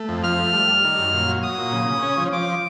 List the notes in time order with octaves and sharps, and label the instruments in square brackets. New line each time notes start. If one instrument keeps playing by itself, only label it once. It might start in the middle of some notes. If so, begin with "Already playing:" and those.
Already playing: [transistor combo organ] A3
F2
[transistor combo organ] F3 [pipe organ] F6
[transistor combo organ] A3
G3
G3
D#3
F#2
A#2
F#3
[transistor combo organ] F#3 [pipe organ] D#6
[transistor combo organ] A#2
C#3
C#3
C#4
F3
[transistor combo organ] F3 [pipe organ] D6